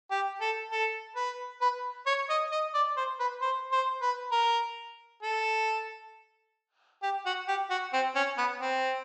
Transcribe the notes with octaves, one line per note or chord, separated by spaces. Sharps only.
G4
A4
A4
B4
B4
C#5
D#5
D#5
D5
C5
B4
C5
C5
B4
A#4
A4
G4
F#4
G4
F#4
C4
C#4
B3
C4